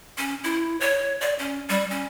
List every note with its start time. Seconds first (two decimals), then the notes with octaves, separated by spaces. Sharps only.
0.18 C#4
0.44 E4
0.80 C#5
1.21 D5
1.39 C#4
1.69 G3
1.91 C#4